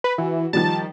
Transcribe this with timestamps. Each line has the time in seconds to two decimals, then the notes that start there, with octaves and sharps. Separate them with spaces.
0.04 B4
0.18 E3 F#4
0.53 D#3 F3 G3 A5